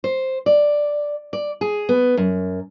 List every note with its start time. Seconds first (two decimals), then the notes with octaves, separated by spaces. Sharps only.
0.04 C5
0.46 D5
1.33 D5
1.61 G#4
1.89 B3
2.17 F#2